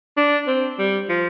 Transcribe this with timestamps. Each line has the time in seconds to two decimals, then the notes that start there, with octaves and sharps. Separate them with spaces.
0.17 D4
0.47 C4
0.79 G3
1.09 F3